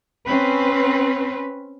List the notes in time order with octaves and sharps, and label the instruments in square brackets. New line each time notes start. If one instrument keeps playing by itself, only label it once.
[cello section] C4 C#4 B4